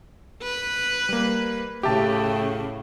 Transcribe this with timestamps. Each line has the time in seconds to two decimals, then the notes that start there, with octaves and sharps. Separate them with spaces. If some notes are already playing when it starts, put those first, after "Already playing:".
0.43 B4
1.09 G3 A#3
1.83 A2 C#3 G4 E5 A5